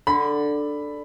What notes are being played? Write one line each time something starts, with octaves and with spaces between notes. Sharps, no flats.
D3 B5